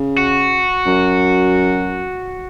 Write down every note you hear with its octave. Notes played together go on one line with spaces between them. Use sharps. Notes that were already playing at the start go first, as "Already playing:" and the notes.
Already playing: C#3
F#4
F#2